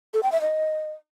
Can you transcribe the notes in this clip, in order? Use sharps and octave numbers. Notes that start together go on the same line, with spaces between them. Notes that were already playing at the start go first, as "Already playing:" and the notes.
A4
G5
E5
D#5